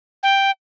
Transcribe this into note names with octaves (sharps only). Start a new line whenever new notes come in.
G5